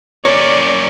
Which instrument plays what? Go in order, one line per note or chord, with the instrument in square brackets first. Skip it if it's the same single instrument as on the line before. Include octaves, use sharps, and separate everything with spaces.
[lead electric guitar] A#3 C#4 [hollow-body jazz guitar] C#5 [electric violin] D5